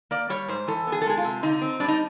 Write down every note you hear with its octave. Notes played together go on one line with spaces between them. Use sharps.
A#3 D5
G3 C#5
G#2 C5
E3 A4
B3
G#4
A4
G#3 G#4
F4
C3
D3 D#4
C4
G3 D4
D#4